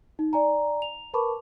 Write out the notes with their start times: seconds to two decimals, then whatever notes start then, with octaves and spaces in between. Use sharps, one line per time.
0.19 D#4
0.33 D5 G#5 A#5
0.82 F7
1.14 A#4 B4 A5 B5 C#6 D6